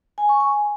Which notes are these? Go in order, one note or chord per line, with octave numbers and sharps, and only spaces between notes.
G#5
C#6
G#5